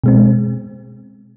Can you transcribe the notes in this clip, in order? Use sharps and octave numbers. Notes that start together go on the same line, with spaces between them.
B2 G#3 C4